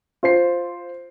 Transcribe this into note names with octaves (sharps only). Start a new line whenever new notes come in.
F4 C5 C7